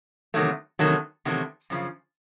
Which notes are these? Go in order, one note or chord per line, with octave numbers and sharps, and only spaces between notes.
E2 C3 D#3 F#3 A3
E2 C3 D#3 F#3 A3
E2 C3 D#3 F#3 A3
F#2 C#3 F3